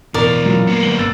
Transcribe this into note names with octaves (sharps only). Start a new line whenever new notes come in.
A1 F2 B2 E3 A#4 D5
A#1 F#2 F#3 G3 F4
A#3 B3 C#7
G1 F#3 A3 F#7 G7
A#1 E2 G2 E6 A6 D7